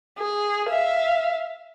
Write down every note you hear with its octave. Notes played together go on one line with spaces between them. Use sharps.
G#4
E5 F5